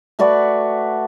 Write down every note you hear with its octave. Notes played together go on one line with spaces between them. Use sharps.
A3 F#4 B4 D5